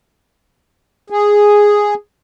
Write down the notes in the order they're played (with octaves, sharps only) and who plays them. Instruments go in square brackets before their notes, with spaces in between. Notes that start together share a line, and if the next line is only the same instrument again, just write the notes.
[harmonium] G#4